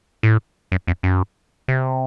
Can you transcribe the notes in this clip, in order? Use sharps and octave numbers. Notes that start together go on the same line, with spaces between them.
A2
F#2
F2
F#2
C3